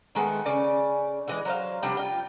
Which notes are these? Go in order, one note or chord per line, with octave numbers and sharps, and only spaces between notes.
D#3 G#3 A3 B3
C#3 C#4 D5 G#5
D3 E3 G#3
F#3 C5 F5
C3 F3 G3 D4
F4 G5